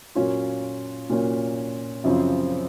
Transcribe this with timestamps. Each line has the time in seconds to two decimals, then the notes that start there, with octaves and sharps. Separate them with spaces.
0.15 A#2 F#3 A#3 C#4 F4
1.10 A#2 F#3 A#3 C#4 F4
2.04 F#2 C#3 F3 C4